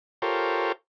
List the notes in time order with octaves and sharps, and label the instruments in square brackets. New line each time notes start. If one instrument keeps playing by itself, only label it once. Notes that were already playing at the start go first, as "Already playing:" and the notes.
[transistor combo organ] F4 G4 A4 A#4 C5 C#5